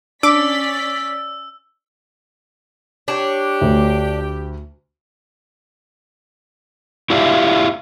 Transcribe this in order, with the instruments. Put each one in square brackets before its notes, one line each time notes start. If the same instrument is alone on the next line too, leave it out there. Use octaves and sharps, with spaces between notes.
[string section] C#4 D5 B6 [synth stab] D4 [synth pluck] D6 [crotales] E6
[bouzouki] D4 C#5 [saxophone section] G4
[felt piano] D2
[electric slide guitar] E4 F4 G4 D5 E5 F5